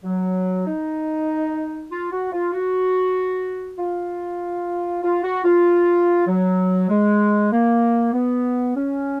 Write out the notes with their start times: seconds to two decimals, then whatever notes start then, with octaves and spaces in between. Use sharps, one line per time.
0.04 F#3
0.67 D#4
1.91 F4
2.12 F#4
2.32 F4
2.53 F#4
3.78 F4
5.03 F4
5.23 F#4
5.44 F4
6.27 F#3
6.89 G#3
7.52 A#3
8.13 B3
8.76 C#4